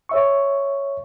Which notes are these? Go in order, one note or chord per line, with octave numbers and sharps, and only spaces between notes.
C#5 E5 C#6